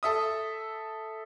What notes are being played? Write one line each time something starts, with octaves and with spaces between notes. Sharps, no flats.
A4 E5 D#6